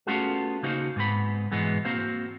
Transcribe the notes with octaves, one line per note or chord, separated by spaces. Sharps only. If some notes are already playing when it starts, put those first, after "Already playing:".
A3 B3 C#4 F4 F#4 G#4
C#3 A#3 D#4 F#4 C5 F5
G#2 B3 C4 F#4 B5
G#2 B2 E3 G#3 B3
A#3 C4 F#4 C5 F5